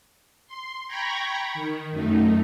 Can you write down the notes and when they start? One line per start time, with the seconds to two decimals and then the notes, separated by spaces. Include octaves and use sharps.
0.47 C6
0.88 G5 A#5 B5 C#6 G#6 A#6
1.54 D#3
1.92 F#2 A3 D#4